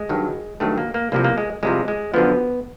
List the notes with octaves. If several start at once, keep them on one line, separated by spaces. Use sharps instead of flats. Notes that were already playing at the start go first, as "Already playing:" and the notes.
Already playing: G#3
G2 D#3 F#3
G2 D#3 F#3 A3
A#3
A#3
C2 C3 F3 A#3
A#3
G#3
C2 C3 F3 G#3
G#3
F#2 D3 F3 B3